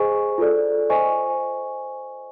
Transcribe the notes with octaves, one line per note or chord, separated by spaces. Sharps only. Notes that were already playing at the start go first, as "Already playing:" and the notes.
Already playing: G#4 C5 D#5 G#5 C#6
F4 A4 D5
C5 D#5 G#5 C#6